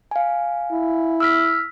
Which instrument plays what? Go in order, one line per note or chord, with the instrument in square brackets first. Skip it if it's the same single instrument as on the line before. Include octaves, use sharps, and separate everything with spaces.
[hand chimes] F5 G#5
[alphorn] E4
[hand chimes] E6 F6 B6